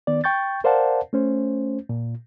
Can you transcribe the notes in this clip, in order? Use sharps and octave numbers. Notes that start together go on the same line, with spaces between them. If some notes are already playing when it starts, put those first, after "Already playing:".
D#3 B3 D5
G5 C#6 G6 A6
A#4 C5 D5 F5 F#5 A5
A3 C#4 C5
A#2